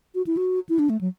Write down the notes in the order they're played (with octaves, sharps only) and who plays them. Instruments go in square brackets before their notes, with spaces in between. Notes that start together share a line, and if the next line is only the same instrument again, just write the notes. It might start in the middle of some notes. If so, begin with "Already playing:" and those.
[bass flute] F#4
E4
F#4
E4
D4
A3
F#3